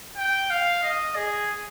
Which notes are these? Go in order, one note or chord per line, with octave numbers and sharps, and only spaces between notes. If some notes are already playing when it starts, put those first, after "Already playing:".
G5
F5
D#5
G#4